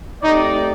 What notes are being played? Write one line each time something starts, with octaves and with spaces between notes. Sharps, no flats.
A3 C4 D#4 G4 D5